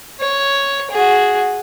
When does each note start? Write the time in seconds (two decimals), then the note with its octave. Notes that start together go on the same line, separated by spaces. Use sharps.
0.20 C#5
0.91 F#4 G#4